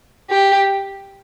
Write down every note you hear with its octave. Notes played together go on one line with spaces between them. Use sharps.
G4